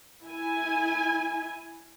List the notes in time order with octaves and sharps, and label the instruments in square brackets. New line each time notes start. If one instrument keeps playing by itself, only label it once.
[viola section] E4 G#5